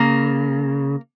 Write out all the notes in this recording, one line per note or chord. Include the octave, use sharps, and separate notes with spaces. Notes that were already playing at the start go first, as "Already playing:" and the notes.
Already playing: C#3 A#3